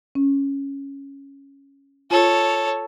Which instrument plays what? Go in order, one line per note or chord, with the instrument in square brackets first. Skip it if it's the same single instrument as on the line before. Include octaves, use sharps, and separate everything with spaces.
[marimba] C#4
[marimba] F4 [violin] A4 C#5